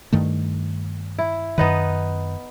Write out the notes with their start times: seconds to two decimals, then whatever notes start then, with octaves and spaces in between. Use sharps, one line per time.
0.13 G2 D#3 A3
1.19 E4
1.58 F#2 D#3 B3 D#4 B4